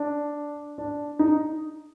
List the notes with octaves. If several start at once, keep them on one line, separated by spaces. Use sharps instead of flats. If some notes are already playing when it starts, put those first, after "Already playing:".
Already playing: D4
D4
D#4